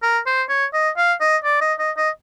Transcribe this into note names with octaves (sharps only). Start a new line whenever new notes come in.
A#4
C5
C#5
D#5
F5
D#5
D5
D#5
D#5
D#5